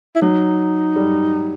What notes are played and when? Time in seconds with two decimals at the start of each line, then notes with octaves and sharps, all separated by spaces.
0.15 E4
0.22 F#3 D#4
0.96 G3